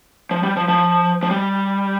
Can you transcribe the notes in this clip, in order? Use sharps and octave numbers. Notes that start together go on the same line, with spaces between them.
F3
G3
F3
F3
F3
G3